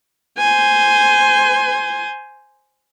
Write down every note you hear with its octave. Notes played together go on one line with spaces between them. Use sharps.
C5 G#5